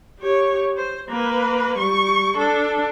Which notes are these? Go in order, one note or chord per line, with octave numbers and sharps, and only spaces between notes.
G4 C#5
C5
A#3 B4
G3 C#6
D4 A4